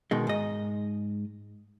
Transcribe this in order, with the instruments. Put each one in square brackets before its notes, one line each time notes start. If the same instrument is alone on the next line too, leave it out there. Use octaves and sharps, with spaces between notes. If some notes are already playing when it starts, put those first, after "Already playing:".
[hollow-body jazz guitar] B2 D#3 G#3
G#2 D#5